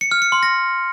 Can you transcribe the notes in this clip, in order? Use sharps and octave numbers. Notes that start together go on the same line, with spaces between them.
C#7
F6
C#7
C6
A#6